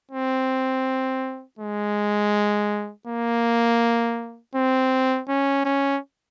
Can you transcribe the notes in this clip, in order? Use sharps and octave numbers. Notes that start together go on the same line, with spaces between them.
C4
G#3
A#3
C4
C#4
C#4